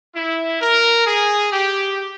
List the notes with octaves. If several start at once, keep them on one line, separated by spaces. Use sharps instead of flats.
E4
A#4
G#4
G4